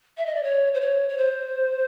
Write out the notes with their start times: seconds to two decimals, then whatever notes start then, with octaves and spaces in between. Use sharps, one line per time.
0.17 E5
0.26 D#5
0.35 D5
0.43 C#5
0.74 C5
0.81 C#5
1.09 C#5
1.17 C5